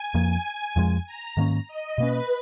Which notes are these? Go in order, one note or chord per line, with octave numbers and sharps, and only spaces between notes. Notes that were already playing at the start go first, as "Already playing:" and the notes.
Already playing: G#5
F2 F3 A#3
F2 F3 G#3
A#5
G#2 D#3 A#3 C#4
D#5
B2 A#3 C#4 B4